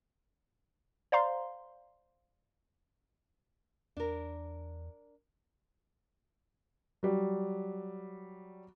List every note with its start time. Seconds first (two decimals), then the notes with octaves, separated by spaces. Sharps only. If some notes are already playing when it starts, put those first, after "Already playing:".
1.12 C5 D5 F5 A#5 C6
3.97 E2 D4 A#4
7.03 F#3 G3